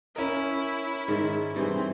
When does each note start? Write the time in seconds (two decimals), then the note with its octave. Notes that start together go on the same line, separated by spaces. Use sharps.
0.16 C#4 E4 A#4
1.08 G#2 D#3
1.56 G2 E3 C4